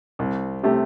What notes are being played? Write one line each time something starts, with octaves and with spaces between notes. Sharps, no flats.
C2
C3 A3 C4 G4